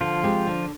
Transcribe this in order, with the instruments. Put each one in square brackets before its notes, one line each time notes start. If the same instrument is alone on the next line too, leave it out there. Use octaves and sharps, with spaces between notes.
[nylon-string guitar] D3 [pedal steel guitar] F3 F4
[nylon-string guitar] G#3 C4 G4
D3